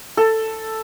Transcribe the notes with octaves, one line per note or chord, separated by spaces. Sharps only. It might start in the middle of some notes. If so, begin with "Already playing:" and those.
A4